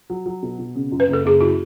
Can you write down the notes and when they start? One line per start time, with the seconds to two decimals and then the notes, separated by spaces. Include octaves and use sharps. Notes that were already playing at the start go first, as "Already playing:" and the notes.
0.10 F#3
0.26 F#3
0.43 B2
0.59 B2
0.75 C#3
0.92 F#2
1.00 B4
1.08 F#1
1.13 A4
1.25 F#1 G#4
1.40 E4 F#4